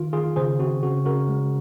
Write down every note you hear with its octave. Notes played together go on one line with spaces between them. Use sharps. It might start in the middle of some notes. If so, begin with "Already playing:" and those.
Already playing: D#3 F4
D#3 F4 G#4
C#3 G#4 C5
C4 F#4
C#3 F#4
C#3 F#4 A#4
G#3